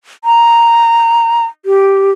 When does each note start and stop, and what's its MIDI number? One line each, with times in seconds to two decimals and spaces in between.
0.24 1.45 82
1.66 2.11 67